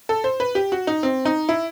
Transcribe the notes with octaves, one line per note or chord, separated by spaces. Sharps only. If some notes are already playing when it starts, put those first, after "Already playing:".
A4
C5
B4
G4
F#4
D#4
C4
D#4
E4